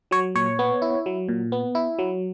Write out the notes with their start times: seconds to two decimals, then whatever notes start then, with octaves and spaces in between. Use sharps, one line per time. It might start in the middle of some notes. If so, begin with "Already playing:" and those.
0.11 F#3 C#5
0.35 A#2 C#5
0.59 B3
0.82 E4
1.06 F#3
1.28 A#2
1.52 B3
1.75 E4
1.99 F#3